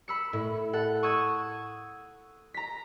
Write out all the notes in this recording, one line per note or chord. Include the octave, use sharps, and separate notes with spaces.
B5 E6 C#7
A2
A4 F#5
C#6 D#6 E6 G#6
A#5 B6